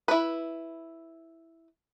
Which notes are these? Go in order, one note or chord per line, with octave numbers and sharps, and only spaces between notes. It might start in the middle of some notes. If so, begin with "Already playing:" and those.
E4 B4